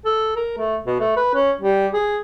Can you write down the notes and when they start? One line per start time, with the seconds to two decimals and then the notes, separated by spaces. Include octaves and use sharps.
0.05 A4
0.36 A#4
0.58 A3
0.86 B2
1.00 A3
1.16 B4
1.34 C#4
1.61 G3
1.93 G#4